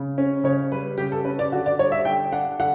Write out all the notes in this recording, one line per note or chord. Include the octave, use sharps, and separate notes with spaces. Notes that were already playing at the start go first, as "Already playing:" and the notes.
Already playing: C#3
C#4
C#3 C#5
G3 B4
C#3 G4
A4
C#4 B4
D5
D3 F#4
D5
G3 C#5
E5
D3 G5
D4 F#5
D3 F#5